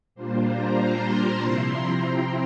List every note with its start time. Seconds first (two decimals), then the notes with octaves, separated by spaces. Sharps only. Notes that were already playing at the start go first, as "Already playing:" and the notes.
0.15 A#2 G3 A#3 D4 F4 C5
0.46 A#5
0.78 C6
1.41 C3 F3 C4 E4 C6
1.73 A#5
2.04 G5